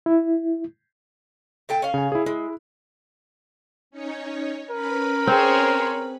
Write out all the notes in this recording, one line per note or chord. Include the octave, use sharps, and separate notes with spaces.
E4
A#2 A4 G5
C#4 F5
C#3 G#5
E4 G#4
G#3 E4
C#4 D#4 C#5
C#4 A#4 B4 B5
C4 G#4 C5 C#5